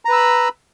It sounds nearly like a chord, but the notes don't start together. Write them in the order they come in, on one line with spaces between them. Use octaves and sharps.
A#5 B4 E6 B5